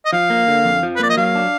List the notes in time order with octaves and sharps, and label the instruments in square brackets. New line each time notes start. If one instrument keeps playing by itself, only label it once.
[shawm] D#5
[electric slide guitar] F3 [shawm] F5
[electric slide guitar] A#3
D3
F2
F3
[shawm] B4
[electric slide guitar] A#3 [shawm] D5
[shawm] D#5
[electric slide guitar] F#3 [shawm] F5
[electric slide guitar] D4